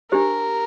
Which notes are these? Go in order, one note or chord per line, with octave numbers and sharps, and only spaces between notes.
D4 G4 A#4 C5